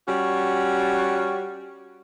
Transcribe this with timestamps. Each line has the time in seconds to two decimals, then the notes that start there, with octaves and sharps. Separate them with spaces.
0.07 G3 C#4 F#4